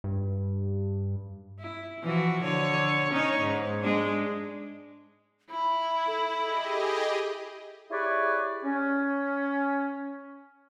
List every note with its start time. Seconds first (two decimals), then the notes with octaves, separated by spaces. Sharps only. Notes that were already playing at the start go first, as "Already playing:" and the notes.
0.04 G2
1.60 E4
2.03 E3 F3 F#4
2.43 D3 C#5
3.11 C#4 D#4 C#5
3.41 G#2
3.81 G#3 D4
5.50 E4 B5
6.07 A4
6.41 G4 G#4 D#5
7.91 E4 G4 G#4 B4 C#5 D5
8.64 C#4